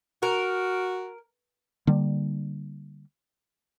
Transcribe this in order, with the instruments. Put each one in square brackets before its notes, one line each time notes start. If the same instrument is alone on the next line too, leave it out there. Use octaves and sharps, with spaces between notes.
[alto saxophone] F#4 [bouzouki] A#4
[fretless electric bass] D3 G3 A#3